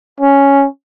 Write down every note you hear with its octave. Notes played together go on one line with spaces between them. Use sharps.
C#4